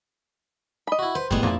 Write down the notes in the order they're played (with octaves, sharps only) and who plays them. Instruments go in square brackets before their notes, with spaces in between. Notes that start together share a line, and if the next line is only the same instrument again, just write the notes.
[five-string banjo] D#5 B5
[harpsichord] E4 F#4
[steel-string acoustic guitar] B4 [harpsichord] C5
[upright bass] F#1 [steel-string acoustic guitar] A2 B3 [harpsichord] G3 G#3
[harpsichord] A#1 A#2 [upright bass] F2 D#4 [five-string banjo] A#3 E4